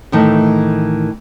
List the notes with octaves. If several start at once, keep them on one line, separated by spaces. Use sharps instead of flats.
A2 D#3 E3 A3